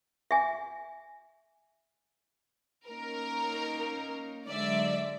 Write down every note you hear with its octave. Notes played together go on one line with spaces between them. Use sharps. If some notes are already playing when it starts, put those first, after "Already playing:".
E5 G#5
A#3 C#4 D#4 A#4
D3 F#3 G#3 D5 E5